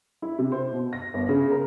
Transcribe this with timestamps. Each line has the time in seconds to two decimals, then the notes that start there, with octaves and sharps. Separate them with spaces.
0.22 E4
0.39 C3
0.52 C5
0.72 B2
0.93 A#6
1.14 G1
1.29 C#3
1.50 A#4